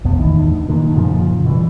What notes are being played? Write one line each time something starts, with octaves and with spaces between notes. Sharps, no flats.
B1 F2 B3
E2 A2 D#3
D2
F#2 A#2 D3 D#3
F#2 A#2 C#3 F3
B2 E3 G3